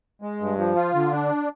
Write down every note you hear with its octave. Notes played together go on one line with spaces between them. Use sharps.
G#3
G2
F3
F4
D3
D4